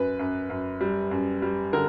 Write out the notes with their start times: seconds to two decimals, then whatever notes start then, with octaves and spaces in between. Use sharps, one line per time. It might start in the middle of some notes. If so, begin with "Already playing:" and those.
Already playing: F#2 B4
0.19 F#2
0.50 F#2
0.81 G3
1.11 F#2
1.42 G3
1.73 D3 A#4